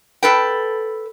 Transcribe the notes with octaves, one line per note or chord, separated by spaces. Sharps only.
A4 B4 G5